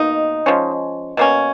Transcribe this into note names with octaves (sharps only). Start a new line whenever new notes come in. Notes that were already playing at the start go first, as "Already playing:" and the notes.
Already playing: B2 A#3 D#4
F3 G#3 C#4
B2 A#3 C#4